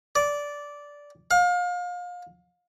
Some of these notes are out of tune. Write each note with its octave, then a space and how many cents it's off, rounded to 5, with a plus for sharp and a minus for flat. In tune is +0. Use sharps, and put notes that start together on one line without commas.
D5 -10
F5 +30